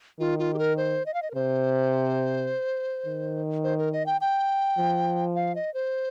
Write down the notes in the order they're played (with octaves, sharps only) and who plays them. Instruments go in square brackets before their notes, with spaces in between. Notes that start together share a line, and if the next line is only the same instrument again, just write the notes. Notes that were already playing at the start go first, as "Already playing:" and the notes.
[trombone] D#3 [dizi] F4
[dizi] F4
G4
A#4
C5
D#5
F5
D#5
A#4
[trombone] C3 [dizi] C5
[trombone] D#3
[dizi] C5
A#4
D#5
G5
G5
[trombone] F3
[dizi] F5
D#5
C5